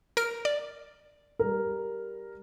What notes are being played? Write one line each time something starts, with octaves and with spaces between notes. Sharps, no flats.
A#4 F6 D7
D5
G3 A#4